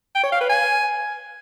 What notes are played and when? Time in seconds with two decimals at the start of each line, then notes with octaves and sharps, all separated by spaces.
0.15 G5
0.24 C#5
0.32 F5
0.41 B4
0.49 G#5